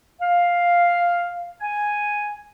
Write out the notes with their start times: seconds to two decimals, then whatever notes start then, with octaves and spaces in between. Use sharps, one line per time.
0.21 F5
1.61 G#5